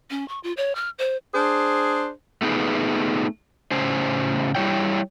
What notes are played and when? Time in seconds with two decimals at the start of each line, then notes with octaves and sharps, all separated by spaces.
0.10 C#4
0.28 C#6
0.43 F4
0.57 C#5
0.75 F6
0.99 C5
1.34 D4 G#4 C5
2.42 A3 B3 D#4 G#4 B4
3.71 A2 C#3 C#4 C5
4.55 G3 E4 C#5 G5